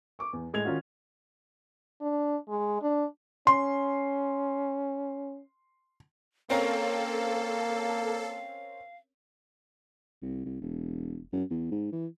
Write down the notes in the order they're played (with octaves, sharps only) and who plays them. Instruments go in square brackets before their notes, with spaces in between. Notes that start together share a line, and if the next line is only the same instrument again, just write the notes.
[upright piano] C#6 D6
E2
A2 G#3 G#6 F7
D#3 C#4 D#4 F4 F#4
[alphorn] D4
G#3
D4
[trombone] C#4 [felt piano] C6
[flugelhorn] A#3 [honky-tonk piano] C4 C#4 A#4 [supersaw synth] A4 [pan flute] F5
[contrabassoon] C2
C2
E1
F#2
E2
G#2
E3